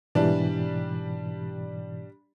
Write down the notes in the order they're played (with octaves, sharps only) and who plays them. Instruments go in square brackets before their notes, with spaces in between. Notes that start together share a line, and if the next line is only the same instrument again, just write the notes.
[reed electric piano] G#2 B2 E3 [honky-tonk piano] G3 D4